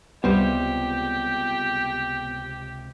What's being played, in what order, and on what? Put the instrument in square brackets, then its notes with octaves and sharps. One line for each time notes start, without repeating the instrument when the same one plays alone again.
[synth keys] C#2 C3 [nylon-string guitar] G3 C5 [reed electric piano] B3 [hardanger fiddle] G4